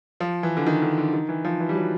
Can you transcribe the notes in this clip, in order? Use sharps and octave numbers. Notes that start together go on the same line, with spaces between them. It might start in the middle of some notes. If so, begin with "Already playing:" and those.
F3
E3
D3
D#3
D3
D3
D#3
E3
F3
E3
G3
F#3